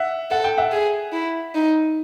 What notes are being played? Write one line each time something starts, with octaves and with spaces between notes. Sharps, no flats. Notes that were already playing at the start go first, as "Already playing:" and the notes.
Already playing: E5 F#5
A4 F#5
G5
E5 F#5
G#4
E4
D#4